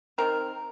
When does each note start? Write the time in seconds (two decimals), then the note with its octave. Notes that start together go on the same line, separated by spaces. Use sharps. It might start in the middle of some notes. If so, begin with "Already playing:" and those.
0.18 D#3 G3 C4 A#4